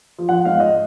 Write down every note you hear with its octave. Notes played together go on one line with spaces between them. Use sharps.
F3
F#5
G#2 F5
D#5